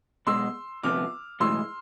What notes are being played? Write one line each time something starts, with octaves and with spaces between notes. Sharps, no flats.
B1 B2 G#3 C6 E6
D2 C3 F3 B3 D6 F6
B1 A2 E3 G#3 C6 E6